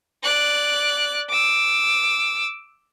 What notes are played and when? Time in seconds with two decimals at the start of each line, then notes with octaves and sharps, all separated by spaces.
0.23 D5 F#6
1.29 D6 E6